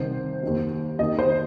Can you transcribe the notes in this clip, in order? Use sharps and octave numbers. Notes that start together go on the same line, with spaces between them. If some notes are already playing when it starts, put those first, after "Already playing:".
Already playing: C2 C3 D#3 C5
D#2 D#3
D#2 D#3 D#5
C5